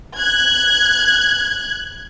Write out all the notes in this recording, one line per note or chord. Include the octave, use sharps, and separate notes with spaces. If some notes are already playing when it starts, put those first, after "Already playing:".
F#6 G#6